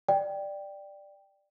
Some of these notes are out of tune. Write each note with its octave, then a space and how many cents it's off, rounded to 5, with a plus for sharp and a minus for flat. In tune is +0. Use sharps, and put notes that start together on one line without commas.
D5 +10 G5 +0